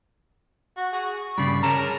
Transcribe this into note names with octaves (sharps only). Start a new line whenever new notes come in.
F#4
F#4 G#4
C#6
G2 C#3 D5 B5
G#4 A#4 C#5 A5 A#5